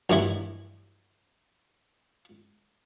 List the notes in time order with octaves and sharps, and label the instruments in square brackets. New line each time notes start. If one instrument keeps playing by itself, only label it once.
[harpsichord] A#1 G2 E3 E4